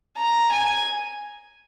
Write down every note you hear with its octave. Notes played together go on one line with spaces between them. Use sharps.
A#5
G#5